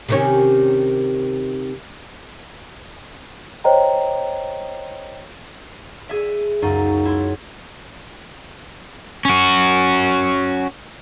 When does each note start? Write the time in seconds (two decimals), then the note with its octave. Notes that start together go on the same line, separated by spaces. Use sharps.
0.09 C3 D#3 C#4
3.64 C5 C#5 D#5 G5 A#5
6.08 G#4 E5 D7
6.62 C#2 F#2 G#3 D#4
7.05 E4 C6
9.25 C#4 F#4